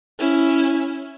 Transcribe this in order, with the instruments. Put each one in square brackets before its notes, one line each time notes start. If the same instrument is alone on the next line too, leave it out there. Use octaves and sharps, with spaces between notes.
[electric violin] C#4 E4